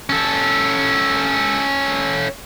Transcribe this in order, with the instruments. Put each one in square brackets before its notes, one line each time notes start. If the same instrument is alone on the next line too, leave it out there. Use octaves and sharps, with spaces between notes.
[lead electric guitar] C#4 A4